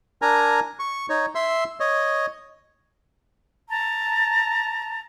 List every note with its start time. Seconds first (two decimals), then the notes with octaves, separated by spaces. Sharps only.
0.22 D4 A#4 G#5 A#5
0.79 C#6
1.09 D#4 C#5
1.35 E5 C6 E6
1.80 C#5 D#5
3.70 A5 A#5